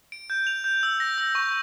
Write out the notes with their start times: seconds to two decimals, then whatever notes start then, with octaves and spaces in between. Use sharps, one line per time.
0.12 D7
0.30 G6
0.47 F7
0.64 G6
0.83 E6
1.00 A#6
1.18 E6
1.35 C#6